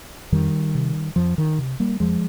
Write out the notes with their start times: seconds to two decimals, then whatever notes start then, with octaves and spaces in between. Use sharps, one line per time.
0.32 F2 D#3 G3
0.75 C3
1.16 F2 F3
1.38 D#3
1.58 C3
1.80 G3 A#3
2.00 F2 F3 G#3